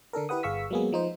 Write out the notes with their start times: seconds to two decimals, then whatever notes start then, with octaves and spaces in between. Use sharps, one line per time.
0.13 D3 D4 A4 A#4
0.29 E4 G4 B4 F#5 D#6
0.43 G1 G#4 F5 C#6 E6 B6
0.70 F#3 G#3 A#3 B3 G#4
0.92 F3 D#4 C5